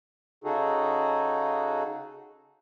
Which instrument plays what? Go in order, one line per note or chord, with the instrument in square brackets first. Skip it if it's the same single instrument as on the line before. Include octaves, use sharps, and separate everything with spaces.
[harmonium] C#3 D#4 F#4 G#4 A4